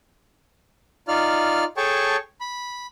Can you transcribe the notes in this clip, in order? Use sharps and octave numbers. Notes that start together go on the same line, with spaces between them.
D#4 F4 D5 F6
G#4 A4 C#5 G5 A5 C#6
B5